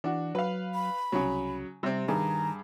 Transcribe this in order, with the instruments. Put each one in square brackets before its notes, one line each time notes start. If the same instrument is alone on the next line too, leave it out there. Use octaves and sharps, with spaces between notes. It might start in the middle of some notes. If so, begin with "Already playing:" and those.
[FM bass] E3 [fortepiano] D4 F#4
[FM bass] F#3 [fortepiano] B4 F5
[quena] B5
[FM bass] C2 [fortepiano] C#3 F#3
[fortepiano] C3 C4 [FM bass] G3
[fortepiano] G2 G#4 [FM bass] D#3 [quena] A#5